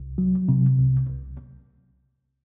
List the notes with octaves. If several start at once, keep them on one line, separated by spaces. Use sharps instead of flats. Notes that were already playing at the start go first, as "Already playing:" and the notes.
Already playing: C2
F#3
C3
C2
C2